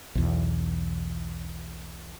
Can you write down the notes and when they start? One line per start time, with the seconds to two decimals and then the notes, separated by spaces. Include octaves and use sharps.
0.15 B1 E2